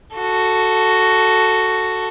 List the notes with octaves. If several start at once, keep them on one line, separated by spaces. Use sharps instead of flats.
F#4 A4